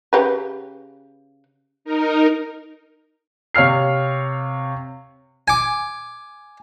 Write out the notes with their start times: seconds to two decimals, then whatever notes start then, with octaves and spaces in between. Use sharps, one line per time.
0.13 C#3 G4 B4
1.85 D#4 A#4
3.55 C3 C#5 F5 F6 C7
5.48 G#5 D6